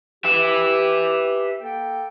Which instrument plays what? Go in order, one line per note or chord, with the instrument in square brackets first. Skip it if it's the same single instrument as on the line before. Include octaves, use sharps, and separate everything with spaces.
[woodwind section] G4 [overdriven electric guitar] B4 E5
[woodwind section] A#3 A4 G5